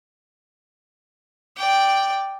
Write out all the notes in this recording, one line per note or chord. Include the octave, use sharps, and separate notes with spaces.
D5 G5